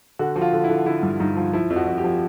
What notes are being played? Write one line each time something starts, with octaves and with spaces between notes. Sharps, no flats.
D3 F#4
F3 F#4
F4
D3
E4
D3
D3 E4
G2
G2 D#4
F3
F3 E4
F2
F#4
F2
G4
F3